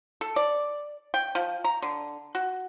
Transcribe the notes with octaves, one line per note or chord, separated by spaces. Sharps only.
A4
D5
G5
F3
A#5
D3
F#4